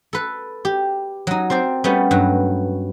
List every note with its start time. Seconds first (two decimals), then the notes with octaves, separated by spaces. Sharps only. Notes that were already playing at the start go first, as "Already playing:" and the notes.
0.13 A4 B4
0.65 G4
1.27 F#3 D#4
1.50 C4 A#4 C5 D5
1.84 G3 A3 B3 C#4
2.11 G2 F#3